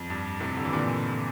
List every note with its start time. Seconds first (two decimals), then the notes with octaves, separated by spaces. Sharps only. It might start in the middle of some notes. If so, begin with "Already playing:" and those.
Already playing: F2
0.10 G2
0.40 A2 C3
0.57 D3
0.65 E3
0.73 A#2 D3